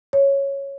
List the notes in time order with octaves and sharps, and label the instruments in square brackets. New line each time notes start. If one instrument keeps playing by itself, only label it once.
[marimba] C#5